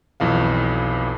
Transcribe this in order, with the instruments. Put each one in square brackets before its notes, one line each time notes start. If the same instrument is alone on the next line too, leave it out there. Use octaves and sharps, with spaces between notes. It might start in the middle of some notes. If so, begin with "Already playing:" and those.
[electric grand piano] B1 F2 E3 F5